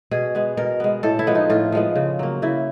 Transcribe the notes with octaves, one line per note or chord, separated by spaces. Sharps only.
B2 G#4
G#3 B3
B2 A#4
G#3 B3
A2 A4
E4
F3 G#3 B3
D#4
A2 F4
F3 G#3 B3
C#3
F#3 A#3
C#3 E4